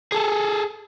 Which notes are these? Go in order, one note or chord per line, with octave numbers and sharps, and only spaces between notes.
G#4 A4